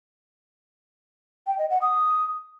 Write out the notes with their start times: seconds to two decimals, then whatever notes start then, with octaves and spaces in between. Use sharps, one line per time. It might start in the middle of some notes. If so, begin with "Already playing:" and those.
1.47 G5
1.58 D#5
1.70 F#5
1.82 D#6